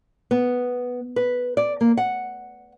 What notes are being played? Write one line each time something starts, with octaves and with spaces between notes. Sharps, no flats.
B3
B4
D5
A#3
F#5